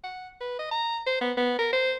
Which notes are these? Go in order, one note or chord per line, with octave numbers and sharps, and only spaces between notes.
F#5
B4
D#5
A#5
C5
B3
B3
A#4
C5